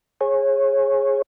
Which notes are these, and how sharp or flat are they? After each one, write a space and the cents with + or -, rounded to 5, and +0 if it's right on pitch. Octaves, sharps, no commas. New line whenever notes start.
G#4 +0 C#5 -30